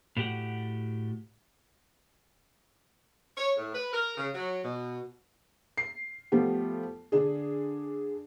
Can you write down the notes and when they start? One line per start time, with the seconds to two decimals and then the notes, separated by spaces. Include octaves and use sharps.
0.17 A2 F#4 G4 F#5
3.37 C#5
3.57 A2
3.74 B4
3.93 A#4
4.17 C#3
4.34 F#3
4.64 B2
5.78 C7
6.32 F3 G3 A3 B3 G4
7.12 D3 D4 G#4